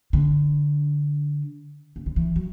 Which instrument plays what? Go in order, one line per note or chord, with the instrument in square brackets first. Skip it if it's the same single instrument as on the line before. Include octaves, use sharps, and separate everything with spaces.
[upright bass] D3
C#3
D3
E3
F#3